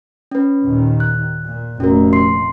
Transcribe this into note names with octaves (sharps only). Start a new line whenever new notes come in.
C#4 B4
D#2 A#2 D#3
F#6
A#2
F1 A#3 C#4 F#4 A#4
C6 C7